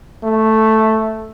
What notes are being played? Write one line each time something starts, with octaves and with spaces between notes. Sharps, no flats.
A3